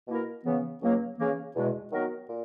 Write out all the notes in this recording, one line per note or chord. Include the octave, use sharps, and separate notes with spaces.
B2 A#3 E4 A#4
C#3 E3 B3
C#2 C#3 F#3 A#3
C#3 E3 A#3
E2 B2 G#3
D#3 F#3 B3 F#4 A#4
A#2